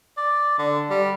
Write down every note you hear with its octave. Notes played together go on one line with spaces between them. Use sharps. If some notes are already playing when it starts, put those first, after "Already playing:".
D5
D3
G3